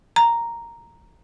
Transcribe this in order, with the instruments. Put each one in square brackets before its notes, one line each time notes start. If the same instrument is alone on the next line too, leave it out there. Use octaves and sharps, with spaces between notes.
[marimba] A#5